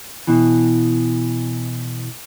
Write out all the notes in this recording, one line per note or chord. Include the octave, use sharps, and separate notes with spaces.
B2 E3